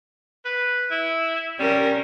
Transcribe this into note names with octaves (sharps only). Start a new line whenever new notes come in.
B4
E4
G3 C#4 A#4